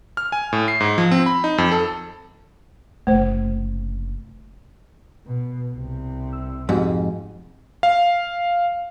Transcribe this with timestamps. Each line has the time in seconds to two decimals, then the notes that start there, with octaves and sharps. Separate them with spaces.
0.17 F6
0.32 G#5
0.53 A2
0.68 C7
0.80 G#2
0.98 F3
1.11 C4
1.26 B5
1.44 D#4
1.58 F2
1.72 A4
3.07 F#1 C3 A3 C5
5.27 B2
5.74 C2 C3
6.33 E6
6.69 F2 G#2 G#3 F#4 G4
7.83 F5